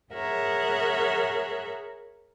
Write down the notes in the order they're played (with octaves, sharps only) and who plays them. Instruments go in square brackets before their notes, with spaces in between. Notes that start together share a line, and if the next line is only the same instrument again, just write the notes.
[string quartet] G#4 A#4 C#5 E5 F#5